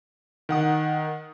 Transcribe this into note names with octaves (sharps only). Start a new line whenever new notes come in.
D#3 F#5 D#6